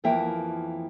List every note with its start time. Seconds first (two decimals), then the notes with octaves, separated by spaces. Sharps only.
0.04 F2 E3 F3 A#3 E5 G5